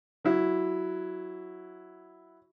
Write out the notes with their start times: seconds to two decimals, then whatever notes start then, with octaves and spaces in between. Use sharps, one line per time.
0.24 F#3 E4